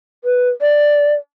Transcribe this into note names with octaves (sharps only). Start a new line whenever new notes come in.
B4
D5